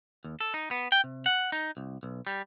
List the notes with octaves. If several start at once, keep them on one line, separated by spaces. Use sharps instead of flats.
D#2
A4
D#4
B3
G5
C3
F#5
D#4
C2
B1
G3